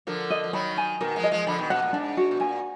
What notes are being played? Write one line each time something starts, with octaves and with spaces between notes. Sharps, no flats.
D3 F3 A#4
D#5
F3
D#3 F#3 B5
G#5
B2 D#3 A#4
F3 G#3
D#5
F3 G#3
D3 F3 B5
B2 D#3
B2 F#5
A#2
G#2 D4
F#4
B2
A#2 G#5